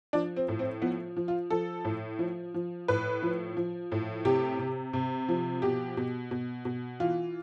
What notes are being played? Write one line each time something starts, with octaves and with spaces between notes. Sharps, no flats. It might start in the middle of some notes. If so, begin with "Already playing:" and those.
F3 D4
C4
A2
C4
F3 B3
F3
F4
F3 A4
A2
F3
F3
A2 B4
F3
F3
A2
C3 G4
C3
C3
F3
B2 G4
B2
B2
B2
E3 F4